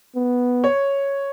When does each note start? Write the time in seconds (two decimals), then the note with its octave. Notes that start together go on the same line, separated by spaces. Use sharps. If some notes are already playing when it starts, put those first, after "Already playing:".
0.15 B3
0.64 C#5